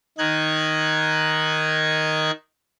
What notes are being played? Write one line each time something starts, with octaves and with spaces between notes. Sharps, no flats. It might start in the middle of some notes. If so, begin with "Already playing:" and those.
D#3 D#4 F#6 G#6